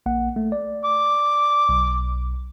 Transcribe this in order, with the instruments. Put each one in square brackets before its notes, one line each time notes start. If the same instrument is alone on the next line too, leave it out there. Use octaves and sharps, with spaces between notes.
[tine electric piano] A#1 A#3 F#5
A3
D5
[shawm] D6
[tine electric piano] B1